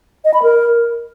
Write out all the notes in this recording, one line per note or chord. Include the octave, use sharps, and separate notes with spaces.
D#5
B5
A#4